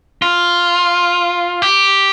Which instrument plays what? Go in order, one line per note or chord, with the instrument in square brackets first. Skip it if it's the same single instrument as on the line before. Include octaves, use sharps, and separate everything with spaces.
[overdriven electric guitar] F4
G4